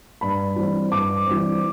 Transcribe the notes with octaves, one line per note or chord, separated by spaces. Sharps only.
G2 B5
E3 G3 C4
G2 D6
E3 G3 C4